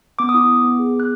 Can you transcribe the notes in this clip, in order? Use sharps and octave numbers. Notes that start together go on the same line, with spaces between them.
B3 D6
D#6
E4 D6
B3
B3
G#4
B3
F#6